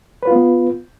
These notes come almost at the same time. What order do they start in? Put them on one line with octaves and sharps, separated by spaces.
B4 F4 B3